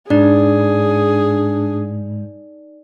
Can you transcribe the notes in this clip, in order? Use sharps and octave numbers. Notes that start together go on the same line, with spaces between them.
G#2 D4 D#4 G#4 D5